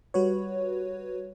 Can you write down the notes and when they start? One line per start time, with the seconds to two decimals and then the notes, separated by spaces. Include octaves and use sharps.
0.14 G3 F#4 B4 C#5